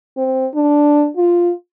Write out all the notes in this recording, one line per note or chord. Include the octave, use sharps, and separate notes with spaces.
C4
D4
F4